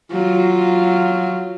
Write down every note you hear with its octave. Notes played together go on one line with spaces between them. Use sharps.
F#3 F4